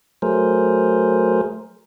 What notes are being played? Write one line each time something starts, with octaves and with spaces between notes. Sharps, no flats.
F#3 A3 G#4 A#4 C5